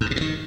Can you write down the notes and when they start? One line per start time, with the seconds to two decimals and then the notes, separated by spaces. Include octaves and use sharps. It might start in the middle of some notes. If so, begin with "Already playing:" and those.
0.01 G#2
0.06 G2
0.11 B2
0.16 A#2
0.21 D#3